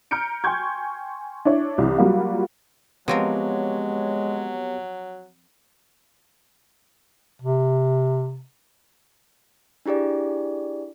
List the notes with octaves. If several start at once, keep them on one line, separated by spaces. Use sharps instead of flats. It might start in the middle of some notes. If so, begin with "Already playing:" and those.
A#5 F6 G6 C#7 D7
G5 G#5 C6 C#6 G6 G#6
D4 E4 C#5
C2 E3
F#3 G3 A#3 F4 F#4 F5
F3 F#3 G#3 B3 C4 G4 A#4 C#5
C3
D4 E4 G4 G#4 D5